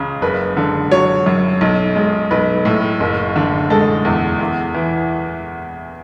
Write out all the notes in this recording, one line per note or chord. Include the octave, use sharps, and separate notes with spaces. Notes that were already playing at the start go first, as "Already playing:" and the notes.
Already playing: C#2 C#3
F#1 B4
D3
F#3 C#5
F#2
B1
G#3
B1 B4
A2
F#1
D3
G#3 A4
E2
E2
E3